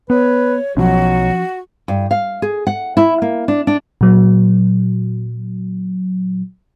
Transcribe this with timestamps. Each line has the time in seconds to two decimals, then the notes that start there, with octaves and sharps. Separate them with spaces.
0.10 B3 B4 C#5
0.77 B1 F3 F#3 C#4 F#4
1.88 G2
2.11 F5
2.42 G#4
2.67 F#5
2.97 E4
3.22 A#3
3.48 D4
3.67 D4
4.01 A#2 F#3